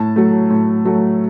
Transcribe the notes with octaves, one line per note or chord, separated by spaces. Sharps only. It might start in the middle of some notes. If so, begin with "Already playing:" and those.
Already playing: A2 A5
F#3 A3
A2
F#3 A3